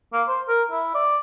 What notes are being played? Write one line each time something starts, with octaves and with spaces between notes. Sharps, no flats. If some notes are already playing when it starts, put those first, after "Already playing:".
A#3
C5
A#4
E4
D5